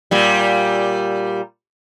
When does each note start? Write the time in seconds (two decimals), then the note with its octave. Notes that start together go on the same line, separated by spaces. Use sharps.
0.11 A#2 G3